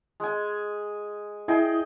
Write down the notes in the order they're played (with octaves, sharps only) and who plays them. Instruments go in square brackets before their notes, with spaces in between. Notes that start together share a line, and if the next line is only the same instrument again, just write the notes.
[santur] G#3 G#5
[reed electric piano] E4 [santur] G#4 D#5 G5